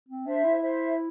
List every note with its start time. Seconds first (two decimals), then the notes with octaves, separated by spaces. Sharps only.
0.09 C4
0.26 D4 C5 E5
0.44 E4
0.62 C5 E5